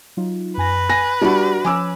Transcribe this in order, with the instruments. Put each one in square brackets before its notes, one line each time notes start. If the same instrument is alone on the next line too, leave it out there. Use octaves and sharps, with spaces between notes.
[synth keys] F#3 D#4 F4
[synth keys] F#2 G#5 A#6 [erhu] B4
[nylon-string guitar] G#5 [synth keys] F#6 [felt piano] A#6
[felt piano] G3 [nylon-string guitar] D4 F#4 [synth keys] E5 B5
[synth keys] F3 C#4 C#5 [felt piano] G#5 D6 E6